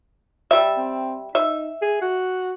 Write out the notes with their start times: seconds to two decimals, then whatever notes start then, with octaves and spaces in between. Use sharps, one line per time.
0.51 G3 E5
0.77 C4
1.35 D#4 E5
1.82 G#4
2.02 F#4